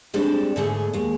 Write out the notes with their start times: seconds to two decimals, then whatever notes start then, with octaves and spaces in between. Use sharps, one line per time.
0.14 G3 G#3 C4 D4 G4 A4
0.56 G#2 D3 A3 B3 G#4
0.93 D#2 G#3